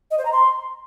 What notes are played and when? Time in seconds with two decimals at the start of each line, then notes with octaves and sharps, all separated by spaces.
0.11 D#5
0.18 C5
0.25 A#5
0.32 C6